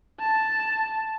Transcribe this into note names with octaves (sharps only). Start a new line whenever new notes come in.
A5